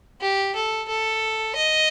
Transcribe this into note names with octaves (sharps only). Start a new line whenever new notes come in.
G4
A4
A4
D#5